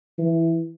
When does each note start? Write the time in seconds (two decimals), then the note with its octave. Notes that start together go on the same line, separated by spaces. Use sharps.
0.18 E3